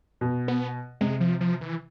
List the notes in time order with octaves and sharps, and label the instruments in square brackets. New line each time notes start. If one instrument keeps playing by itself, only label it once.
[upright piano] B2
[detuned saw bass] B3
[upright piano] C3 [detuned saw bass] G#3
[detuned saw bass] F3
F3
E3